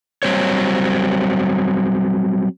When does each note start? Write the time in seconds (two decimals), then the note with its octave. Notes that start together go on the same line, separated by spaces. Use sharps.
0.23 F#3 G3 C4 C5 C#5